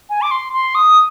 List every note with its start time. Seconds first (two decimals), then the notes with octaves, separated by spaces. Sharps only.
0.10 G#5
0.22 D6
0.31 C6
0.53 C6
0.75 D#6